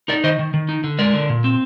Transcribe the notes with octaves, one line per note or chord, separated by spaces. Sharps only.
D#4 A#4 D5
D#3 C5 D#5
D#3
D#3
D#4
D3
G#3 A#4 D5
D3
A#2
C4